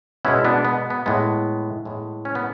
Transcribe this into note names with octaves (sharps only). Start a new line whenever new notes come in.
B2 G#3 B3 C#4 E4
B3 D4
B3
B3
A2 G#3 B3
A2 G#3 B3
C#4
B3